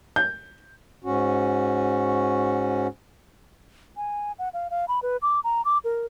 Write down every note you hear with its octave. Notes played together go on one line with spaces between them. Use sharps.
G6
G#2 C#4 F#4
G#5
F#5
F5
F5
B5
B4
D6
A#5
D6
A#4